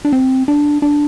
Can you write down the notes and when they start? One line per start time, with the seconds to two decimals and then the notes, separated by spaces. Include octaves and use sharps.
0.05 D4
0.13 C4
0.48 D4
0.82 D4